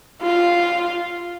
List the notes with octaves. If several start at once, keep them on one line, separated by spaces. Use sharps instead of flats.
F4